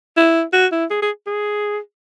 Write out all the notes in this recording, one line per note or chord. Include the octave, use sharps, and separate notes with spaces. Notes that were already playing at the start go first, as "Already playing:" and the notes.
E4
F#4
E4
G#4
G#4
G#4